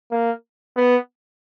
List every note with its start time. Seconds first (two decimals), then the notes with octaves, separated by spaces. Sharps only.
0.11 A#3
0.77 B3